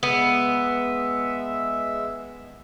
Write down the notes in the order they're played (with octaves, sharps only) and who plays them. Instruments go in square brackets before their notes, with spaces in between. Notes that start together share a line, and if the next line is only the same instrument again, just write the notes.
[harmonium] G#3 E5 [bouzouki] B3